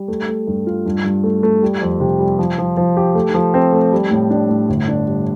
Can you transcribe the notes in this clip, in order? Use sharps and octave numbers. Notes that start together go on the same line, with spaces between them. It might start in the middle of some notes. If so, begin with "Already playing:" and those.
Already playing: G3
A3
A3
G2
F4
G2
G2
A3
A3
G3
F2
C3
G3
F3
F3
F3
G4
A3
F3
C4
A3
G3
A2
D4
A2
G1
D4
G3